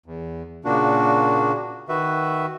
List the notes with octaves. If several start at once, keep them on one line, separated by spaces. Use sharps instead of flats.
E2
A#2 C#3 A#3 D4 F#4
D#3 F#4 B4 E5